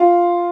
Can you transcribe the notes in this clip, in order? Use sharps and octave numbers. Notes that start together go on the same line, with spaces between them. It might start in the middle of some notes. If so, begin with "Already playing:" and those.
Already playing: F4